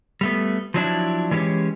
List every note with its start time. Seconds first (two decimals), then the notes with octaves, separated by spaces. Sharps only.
0.21 G3 A3 B3
0.74 F3 F#3 D4 E4
1.31 E3 G#3 C#4 G4 C#5